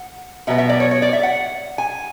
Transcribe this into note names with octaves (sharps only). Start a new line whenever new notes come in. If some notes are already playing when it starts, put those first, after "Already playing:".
Already playing: F#5
B2 F#3 B3 E5
E5
D5
C#5
C#5
D5
E5
F#5
G#5